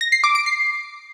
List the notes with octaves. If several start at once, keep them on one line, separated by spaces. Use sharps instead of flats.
A#6
C7
D6
D7
C7